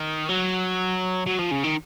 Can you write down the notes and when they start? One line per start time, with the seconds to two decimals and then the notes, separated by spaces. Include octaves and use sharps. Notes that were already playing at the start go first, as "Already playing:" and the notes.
Already playing: D#3
0.29 F#3
1.27 F#3
1.39 F3
1.51 C#3
1.64 D#3